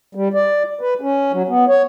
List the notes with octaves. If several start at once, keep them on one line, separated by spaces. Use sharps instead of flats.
G3
D5
B4
C#4
F#3
B3
C#5